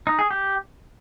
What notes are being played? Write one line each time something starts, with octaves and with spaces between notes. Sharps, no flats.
D#4
G#4
G4